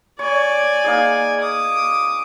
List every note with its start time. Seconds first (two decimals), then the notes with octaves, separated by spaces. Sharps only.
0.19 C#5 D5 G#5
0.84 A#3 D#4 G#4
1.41 D6 D#6